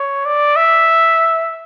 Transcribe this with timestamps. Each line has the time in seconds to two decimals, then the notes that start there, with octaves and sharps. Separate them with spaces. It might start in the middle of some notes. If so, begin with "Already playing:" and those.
Already playing: C#5
0.26 D5
0.56 E5